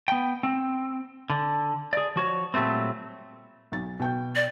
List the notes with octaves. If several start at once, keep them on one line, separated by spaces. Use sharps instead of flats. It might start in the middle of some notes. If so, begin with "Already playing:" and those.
B3 G5
C4
D3
G#4 D5
F3 F#4 C#5
A#2 F#3 G3 A3 C4
B1 A6
B2 G5 G6
D5